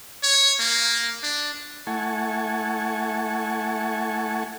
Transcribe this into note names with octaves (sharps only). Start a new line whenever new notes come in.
C#5
A#3
D4
A3 E4 F#5 G#5 A5 C#6